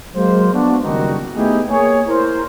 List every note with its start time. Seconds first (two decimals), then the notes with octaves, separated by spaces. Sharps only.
0.15 F#3 G#3 A#3 C5
0.54 B3 D4 F#4
0.84 F#1 D#3 G3 D#4 F#4
1.36 A3 B3 D#4 E4 G4 G#4
1.70 A#3 G#4 C#5
2.09 E4 A#4 C5